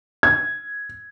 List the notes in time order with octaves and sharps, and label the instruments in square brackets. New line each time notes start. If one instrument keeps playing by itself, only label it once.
[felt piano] G#6